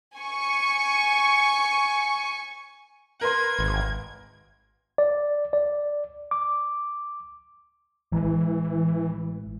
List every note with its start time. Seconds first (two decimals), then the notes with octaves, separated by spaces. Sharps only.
0.16 G#5 C#6
3.21 A#4 B4 C6 G#6
3.59 G#1
4.98 D5
5.53 D5
6.31 D6
8.12 A1 E3 G#3